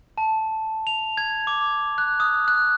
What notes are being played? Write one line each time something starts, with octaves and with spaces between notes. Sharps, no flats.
A5
F7
G#6
D6
F#6
D#6
F#6